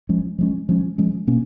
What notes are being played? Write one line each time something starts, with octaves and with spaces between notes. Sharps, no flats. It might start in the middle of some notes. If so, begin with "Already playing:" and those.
F3 G#3 C#4
F3 G#3 C#4
F3 G#3 C#4
F3 G#3 C#4
B2 A#3 C#4